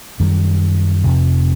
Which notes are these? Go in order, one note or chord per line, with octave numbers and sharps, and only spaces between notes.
F#2 D#3 G3
F2 C3 F3